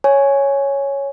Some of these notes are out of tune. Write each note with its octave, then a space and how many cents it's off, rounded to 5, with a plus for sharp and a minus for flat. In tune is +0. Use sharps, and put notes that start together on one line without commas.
C#5 +0 G#5 +0